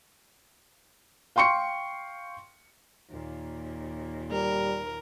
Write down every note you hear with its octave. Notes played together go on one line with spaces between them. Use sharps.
F5 G5 C6 C#6 C#7
D#2 A#2
G3 A#4